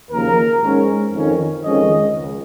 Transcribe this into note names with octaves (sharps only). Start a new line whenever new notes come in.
D#2 C#3 F3 A#3 A#4
G#2 G#3 C#4
F2 D#3 C#4
F2 D#3 G#3 C#4 D#5
C#2